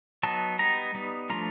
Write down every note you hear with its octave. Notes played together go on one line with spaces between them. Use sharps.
F#3 B3 D#4 A5
G3 B3 D#4 A#5
G3 B3 D#4
F3 A3 D4 F4 A#5